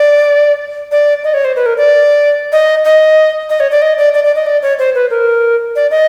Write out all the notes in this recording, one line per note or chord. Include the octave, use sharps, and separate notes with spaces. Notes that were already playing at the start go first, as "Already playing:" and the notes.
Already playing: D5
D5
D#5
C#5
C5
B4
A#4
D5
D#5
D#5
D#5
C#5
D5
D#5
D5
D5
D5
D#5
D5
C#5
C5
B4
A#4
D5
D#5